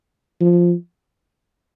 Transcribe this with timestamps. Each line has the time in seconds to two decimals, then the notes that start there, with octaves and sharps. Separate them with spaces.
0.40 F3